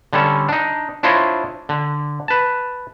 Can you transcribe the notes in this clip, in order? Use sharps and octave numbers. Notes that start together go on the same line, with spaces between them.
D3 G3 C#4 A4
D4 D#4
D4 E4 F4 C5 C#5 D#5
D3
B4 A5